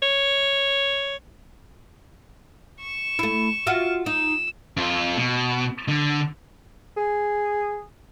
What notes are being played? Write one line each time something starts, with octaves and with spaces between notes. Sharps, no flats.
C#5
C#6 E7
A3 E4
F4 F#4 E5
D#4 E6
F2 F4
B2
D3
G#4